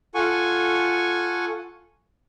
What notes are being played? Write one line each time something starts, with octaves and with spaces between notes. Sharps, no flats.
F4 A4 F#5 G#5 C#6